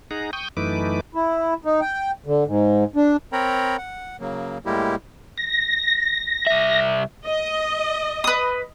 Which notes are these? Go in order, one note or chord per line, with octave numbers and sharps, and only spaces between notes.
D#4 G#4 F#5 A#5
G5 C#6 D#6 G6
F#2 E3 A3 D#4 B4 D6
E4
D#4
G5
D3
G#2
D4
C4 A#4 C#5 G5 A#5 B5
F#5
C#3 F#3 A#3
A2 G3 G#3 A#3 E4 G4
A#6
C2 E5
D#5
B4 D#6